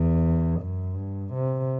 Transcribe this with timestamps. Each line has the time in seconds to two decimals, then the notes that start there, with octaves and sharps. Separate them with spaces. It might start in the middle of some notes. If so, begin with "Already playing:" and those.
Already playing: E2
0.60 F#2
0.96 G2
1.33 C3